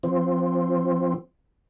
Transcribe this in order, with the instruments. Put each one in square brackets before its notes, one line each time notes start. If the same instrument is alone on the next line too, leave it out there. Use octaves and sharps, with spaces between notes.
[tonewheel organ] F3 C4